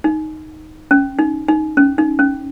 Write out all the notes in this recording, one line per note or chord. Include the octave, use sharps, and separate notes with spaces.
D#4
C#4
D#4
D#4
C#4
D#4
C#4